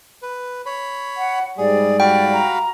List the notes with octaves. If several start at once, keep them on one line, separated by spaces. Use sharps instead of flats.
B4
C#5 B5
F#5
G#2 G3 G#4 D5
F#4 F5 G5 B5
A#5